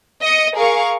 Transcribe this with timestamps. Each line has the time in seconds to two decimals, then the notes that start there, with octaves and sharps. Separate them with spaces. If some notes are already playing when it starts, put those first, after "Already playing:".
0.21 D#5 D#6 C#7
0.55 G#4 A#4 F5 C#6